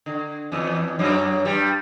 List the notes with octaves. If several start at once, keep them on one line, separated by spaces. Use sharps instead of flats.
D3
E2 E3
F#2 F#3
G2 G3